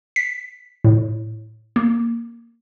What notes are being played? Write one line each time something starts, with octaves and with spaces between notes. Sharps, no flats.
B6
A2
A#3